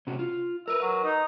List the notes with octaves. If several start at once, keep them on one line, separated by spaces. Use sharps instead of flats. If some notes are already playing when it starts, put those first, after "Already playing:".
C3 C#4 F#4
F4
A#4 B4 E5
F#3
D#4